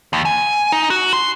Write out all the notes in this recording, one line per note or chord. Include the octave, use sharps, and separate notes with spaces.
D#2
G#5
D#4
F#4
C6